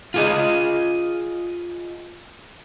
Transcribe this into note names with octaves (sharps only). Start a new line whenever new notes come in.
F4 G#4 D#5